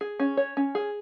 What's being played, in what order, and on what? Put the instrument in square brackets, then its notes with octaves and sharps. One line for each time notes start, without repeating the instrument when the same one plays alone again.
[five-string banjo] G#4
C#4
C#5
C#4
G#4